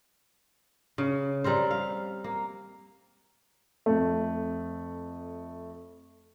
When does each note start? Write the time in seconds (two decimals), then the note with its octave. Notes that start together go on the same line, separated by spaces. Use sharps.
0.98 C#3
1.44 G3 C4 A#4 C5
1.71 F5
2.24 A#3
3.86 F2 A3